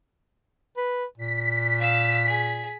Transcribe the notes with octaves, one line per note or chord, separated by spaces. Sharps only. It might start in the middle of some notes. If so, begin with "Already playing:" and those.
B4
A#2 B6
F5 E6
G#4